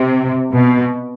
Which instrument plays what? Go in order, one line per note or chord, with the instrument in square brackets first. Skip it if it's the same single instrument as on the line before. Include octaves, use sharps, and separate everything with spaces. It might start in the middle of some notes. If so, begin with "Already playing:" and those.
Already playing: [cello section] C3
B2